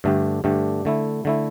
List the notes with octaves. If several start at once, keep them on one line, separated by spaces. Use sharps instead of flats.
G2 D3 A3 D4 G4
G2 D3 A3 D4 G4
D3 A3 E4
D3 A3 E4